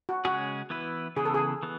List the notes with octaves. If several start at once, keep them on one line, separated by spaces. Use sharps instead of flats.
F#4
C#3 G#3 C#4 F#4 G#4
E3 B3 E4 B4
C#3 E3 B3 G#4
A4
G#4
E3 B3